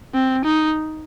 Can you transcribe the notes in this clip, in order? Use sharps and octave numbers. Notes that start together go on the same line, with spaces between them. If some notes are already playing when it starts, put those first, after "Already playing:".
C4
D#4